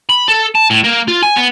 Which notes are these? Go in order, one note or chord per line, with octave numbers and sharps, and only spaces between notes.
B5
A4
A5
A2
A#3
F4
G#5
B3